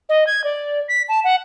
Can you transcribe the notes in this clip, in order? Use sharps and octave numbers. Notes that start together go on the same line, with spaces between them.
D#5
G#6
D5
B6
A5
F#5